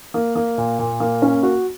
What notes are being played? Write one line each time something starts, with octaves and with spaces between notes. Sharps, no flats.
A#3
A#3
A#2
A#2
A#3
C#4
F#4